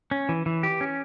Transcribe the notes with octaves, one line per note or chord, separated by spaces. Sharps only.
C#4
E3
E3
G4
C#4